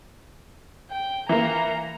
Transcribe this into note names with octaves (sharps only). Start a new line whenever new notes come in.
G5
E3 A#3 A#5